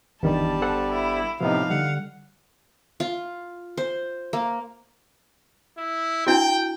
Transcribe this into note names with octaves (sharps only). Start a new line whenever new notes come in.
G1 E2 D#3 G3 B3 D4 A5
A4 C5 F#5
E4
A2 C3 F3 B3 D#4 F5
D3 G3 F#5
F4
C5
A#3
E4
D4 E4 F#4 G5